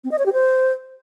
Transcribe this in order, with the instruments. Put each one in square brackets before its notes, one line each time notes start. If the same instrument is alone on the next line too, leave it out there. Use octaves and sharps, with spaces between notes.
[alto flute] C4
D#5
C#5
G4
C5